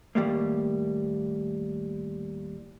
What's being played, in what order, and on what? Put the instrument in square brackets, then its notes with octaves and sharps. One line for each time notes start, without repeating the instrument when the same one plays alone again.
[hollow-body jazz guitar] D#2 A2 C3 G3 G#3 A#3